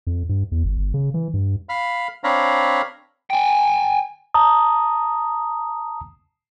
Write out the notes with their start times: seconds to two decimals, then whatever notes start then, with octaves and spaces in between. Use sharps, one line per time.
0.07 F2
0.29 G2
0.52 E2
0.63 G1
0.77 G1
0.94 C#3
1.14 E3
1.34 G2
1.69 F5 B5 F6
2.24 C4 D4 C#5 F5 A#5 B5
3.30 G5 G#5
4.34 A5 A#5 D#6